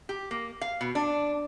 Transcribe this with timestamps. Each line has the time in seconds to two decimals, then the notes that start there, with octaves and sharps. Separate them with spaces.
0.09 G4
0.31 A#3
0.61 F5
0.81 B2
0.95 D4